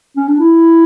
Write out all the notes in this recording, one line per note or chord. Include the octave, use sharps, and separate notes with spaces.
C#4
D4
E4